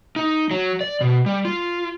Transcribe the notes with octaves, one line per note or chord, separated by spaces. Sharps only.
D#4
F#3
D5
B2
G3
F4